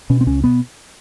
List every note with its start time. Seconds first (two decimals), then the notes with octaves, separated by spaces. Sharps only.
0.10 B2 C#4
0.21 C4
0.27 C#2 C#4
0.43 B2 B3